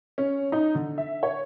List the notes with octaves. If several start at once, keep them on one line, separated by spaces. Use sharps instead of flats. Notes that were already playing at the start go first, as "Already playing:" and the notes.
C#4
D#4
D3
E5
C#5